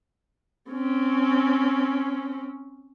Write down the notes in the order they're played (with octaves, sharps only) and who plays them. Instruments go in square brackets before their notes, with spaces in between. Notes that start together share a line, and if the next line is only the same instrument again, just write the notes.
[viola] C4 C#4